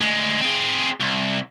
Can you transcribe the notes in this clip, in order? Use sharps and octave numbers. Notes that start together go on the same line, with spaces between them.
D2 G#3
C4 G#4
C2